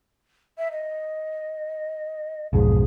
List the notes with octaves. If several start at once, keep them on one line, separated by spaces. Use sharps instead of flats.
E5
D#5
B1 F2 G#2 G#4